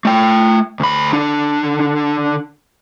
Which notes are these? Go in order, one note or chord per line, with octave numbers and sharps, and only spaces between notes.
A3 G5
D2 B5
D3 D4